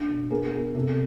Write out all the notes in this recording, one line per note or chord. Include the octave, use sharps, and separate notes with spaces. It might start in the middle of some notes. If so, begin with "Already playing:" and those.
Already playing: D4 A4
B2
B3 G#4 A#4
B3 G#4
C3 A4